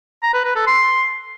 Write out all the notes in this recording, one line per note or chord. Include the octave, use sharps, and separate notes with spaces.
A#5
B4
B4
A4
C6